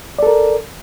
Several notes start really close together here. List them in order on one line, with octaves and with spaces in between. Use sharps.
D5 A4 A#4